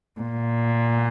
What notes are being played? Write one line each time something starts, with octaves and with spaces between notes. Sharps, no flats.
A#2